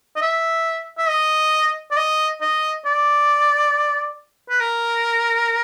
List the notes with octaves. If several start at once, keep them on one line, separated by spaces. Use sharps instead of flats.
D#5
E5
E5
D#5
D5
D#5
D#5
D5
B4
A#4